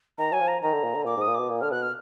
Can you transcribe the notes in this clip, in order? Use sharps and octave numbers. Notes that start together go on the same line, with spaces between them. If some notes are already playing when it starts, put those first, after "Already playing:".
D#3 A#5
F#3 G#5
F3
A#5
D#3 A#5
D3
A#2
D3
A#2 D6
G#2
D#6
A#2
B2 D6
A#2
D3 F6
B2 F#6
F6